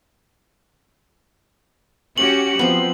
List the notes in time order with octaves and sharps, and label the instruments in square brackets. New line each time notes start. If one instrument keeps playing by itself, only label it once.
[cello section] C#4 F#4 G4 [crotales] F#7
[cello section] F3 [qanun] B3 C4